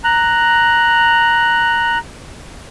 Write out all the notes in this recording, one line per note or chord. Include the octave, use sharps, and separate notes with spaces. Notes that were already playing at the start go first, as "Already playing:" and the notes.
A#5 F#6